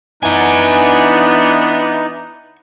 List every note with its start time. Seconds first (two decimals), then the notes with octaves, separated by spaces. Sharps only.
0.23 E3 B3 D4 D#4 F#5 G#5